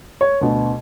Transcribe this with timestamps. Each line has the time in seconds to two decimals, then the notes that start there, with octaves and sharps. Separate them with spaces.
0.21 C#5
0.41 D2 B2